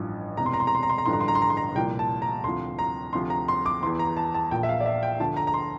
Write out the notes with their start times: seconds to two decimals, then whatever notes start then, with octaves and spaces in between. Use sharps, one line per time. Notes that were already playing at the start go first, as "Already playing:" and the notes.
Already playing: A1 G2 F3
0.37 E1 E2 C3 A#5
0.46 C6
0.53 A#5
0.60 C6
0.67 A#5
0.75 C6
0.83 A#5
0.90 C6
0.98 A#5
1.06 A1 G2 D3 F3 C6
1.13 A#5
1.21 C6
1.28 A#5
1.35 C6
1.42 A#5
1.50 C6
1.57 A#5
1.75 C2 A#2 F3 G5
1.99 A5
2.22 A#5
2.44 D2 C3 F3 C6
2.79 A#5
3.13 D2 C3 F3 C6
3.30 A#5
3.48 C6
3.66 D6
3.82 E3 C6
3.86 E2
3.99 A#5
4.17 A5
4.35 A5
4.51 A#1 A#2 F3 G5
4.63 E5
4.69 F5
4.80 D5
4.86 E5
5.03 G5
5.19 D2 D3 F3 A5
5.37 A#5
5.47 A#5
5.54 C6